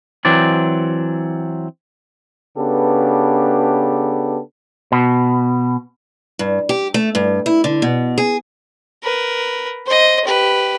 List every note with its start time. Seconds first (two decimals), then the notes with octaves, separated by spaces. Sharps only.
0.25 E3 F#3 C4 D5
2.57 C#3 B3 D4 G4 A4 B4
4.92 B2
6.39 G2
6.69 G4
6.94 A3
7.15 G2
7.46 E4
7.64 D3
7.82 B2
8.18 G#4
9.03 A#4 B4
9.86 C5 D#5
10.25 G4 B4